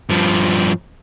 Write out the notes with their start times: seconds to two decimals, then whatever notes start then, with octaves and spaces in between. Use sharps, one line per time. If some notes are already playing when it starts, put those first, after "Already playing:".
0.09 G2 F3